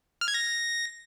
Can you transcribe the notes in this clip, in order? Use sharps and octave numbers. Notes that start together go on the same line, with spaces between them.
F6
G#6
A#6